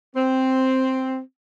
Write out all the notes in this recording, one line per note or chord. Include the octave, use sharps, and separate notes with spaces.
C4